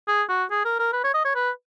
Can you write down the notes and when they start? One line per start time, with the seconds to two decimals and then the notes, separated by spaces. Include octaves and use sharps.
0.08 G#4
0.29 F#4
0.51 G#4
0.65 A#4
0.79 A#4
0.93 B4
1.04 C#5
1.14 D#5
1.25 C#5
1.35 B4